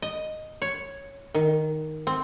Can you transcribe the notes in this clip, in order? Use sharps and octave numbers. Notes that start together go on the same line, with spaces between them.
D#5
C#5
D#3
C4